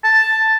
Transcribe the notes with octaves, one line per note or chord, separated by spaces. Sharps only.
A5